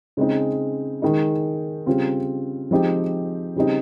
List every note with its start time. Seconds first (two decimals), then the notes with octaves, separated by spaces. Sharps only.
0.17 C#3 G#3 C4 D#4
1.02 D#3 G#3 D#4
1.86 C#3 G3 C4 F4
2.71 F3 G#3 C4 D#4 G4
3.56 C#3 G3 C4 D#4